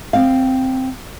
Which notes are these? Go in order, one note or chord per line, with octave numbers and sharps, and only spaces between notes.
C4 F5